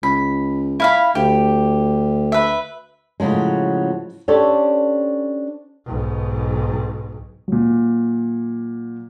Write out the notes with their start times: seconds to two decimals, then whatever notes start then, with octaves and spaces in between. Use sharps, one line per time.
0.03 C#2 B5
0.80 E4 F5 B5
1.15 D2 G4
2.32 B4 E5
3.20 A2 C#3 F3 F#3 G#3
4.28 C#4 D4 G4 A4 C5 C#5
5.86 B1 G#2
7.48 A#2 F#3